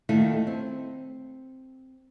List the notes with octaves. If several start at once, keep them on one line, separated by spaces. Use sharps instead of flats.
D#2 D#3 A3 E4 F4
C4